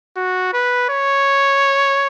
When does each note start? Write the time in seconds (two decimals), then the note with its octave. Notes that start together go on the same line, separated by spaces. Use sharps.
0.16 F#4
0.53 B4
0.89 C#5